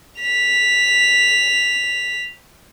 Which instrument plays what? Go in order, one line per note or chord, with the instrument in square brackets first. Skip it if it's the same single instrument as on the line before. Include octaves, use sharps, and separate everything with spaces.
[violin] B6 F7